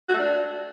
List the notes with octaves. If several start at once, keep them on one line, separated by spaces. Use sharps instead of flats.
F#4
A3
D4